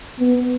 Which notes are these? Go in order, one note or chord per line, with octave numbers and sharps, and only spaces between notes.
B3